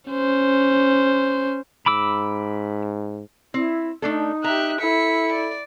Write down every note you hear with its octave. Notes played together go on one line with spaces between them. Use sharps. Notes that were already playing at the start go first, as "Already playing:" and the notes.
C#4 C5
G#2 B5 D6 E6
C4 E4
A3 D4 D#4 A4
G4 E5 A#5 F#6
E4 A4 B6 C#7
D5